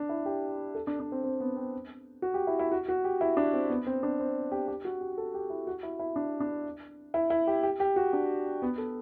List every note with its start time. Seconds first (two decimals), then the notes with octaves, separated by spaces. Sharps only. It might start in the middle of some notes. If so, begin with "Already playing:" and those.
Already playing: D4
0.09 E4
0.26 G4
0.75 A4
0.87 D4
1.00 D4
1.12 C4
1.24 C4
1.40 B3
1.57 C4
2.22 F#4
2.34 G4
2.47 E4
2.59 E4
2.72 F#4
2.89 F#4
3.04 G4
3.21 E4
3.37 D4
3.53 C4
3.70 B3
3.87 C4
4.03 D4
4.20 C4
4.52 G4
4.68 G4
4.85 F#4
5.01 G4
5.18 A4
5.34 G4
5.50 E4
5.67 F#4
5.83 E4
5.99 E4
6.16 D4
6.40 D4
7.14 E4
7.30 E4
7.47 G4
7.63 G4
7.80 G4
7.96 F#4
8.13 D4
8.62 B3
8.78 A4